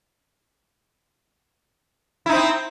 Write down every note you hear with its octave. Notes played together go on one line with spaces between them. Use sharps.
C4 D#4 E4